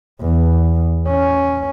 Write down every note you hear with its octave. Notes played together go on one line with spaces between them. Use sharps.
E2
C#4